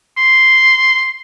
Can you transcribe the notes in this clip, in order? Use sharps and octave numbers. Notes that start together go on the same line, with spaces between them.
C6